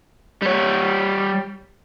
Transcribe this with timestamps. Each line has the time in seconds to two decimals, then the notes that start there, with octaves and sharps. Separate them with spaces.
0.42 G3 C#5